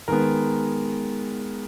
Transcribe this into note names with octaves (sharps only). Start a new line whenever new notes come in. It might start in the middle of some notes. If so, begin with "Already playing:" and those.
D#3 G#3 B3 A#4